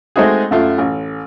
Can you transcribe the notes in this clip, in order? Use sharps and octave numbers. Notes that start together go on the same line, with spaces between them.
G#3 A3 C4 D#4 F#4 G#4
F#2 A3 F4
A1